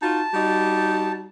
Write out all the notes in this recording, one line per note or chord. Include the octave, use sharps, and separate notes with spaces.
D#4 F4 F#4 A5
G3 D#4 F#4